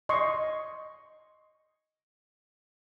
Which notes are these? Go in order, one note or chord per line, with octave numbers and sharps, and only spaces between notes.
D#5 C6 C#6